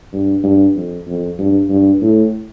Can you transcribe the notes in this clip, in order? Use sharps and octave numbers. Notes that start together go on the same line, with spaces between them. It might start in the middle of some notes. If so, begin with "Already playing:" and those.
G2
G2
F2
F2
G2
G2
A2